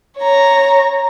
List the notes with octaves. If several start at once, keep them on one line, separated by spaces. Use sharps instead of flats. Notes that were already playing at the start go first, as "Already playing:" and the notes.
C#5 A#5